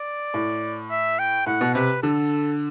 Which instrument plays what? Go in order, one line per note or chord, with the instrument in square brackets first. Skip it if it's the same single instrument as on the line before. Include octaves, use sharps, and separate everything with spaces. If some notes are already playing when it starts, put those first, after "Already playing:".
Already playing: [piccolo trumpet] D5
[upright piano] A2
[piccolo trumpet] E5
G5
[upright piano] A2 [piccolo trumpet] F#5
[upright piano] B2
[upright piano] C3 [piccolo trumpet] B4
[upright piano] D3 [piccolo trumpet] A4